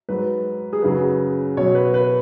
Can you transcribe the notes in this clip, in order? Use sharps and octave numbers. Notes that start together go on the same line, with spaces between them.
G#2 F#3 B4
G#4
F#2 C#3 F#3 B4
B2 F#3 C#5
B4
B4